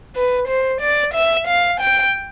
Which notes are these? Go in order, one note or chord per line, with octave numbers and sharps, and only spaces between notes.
B4
C5
D5
E5
F5
G5